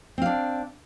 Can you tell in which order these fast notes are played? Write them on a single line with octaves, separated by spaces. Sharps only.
C4 F5 D4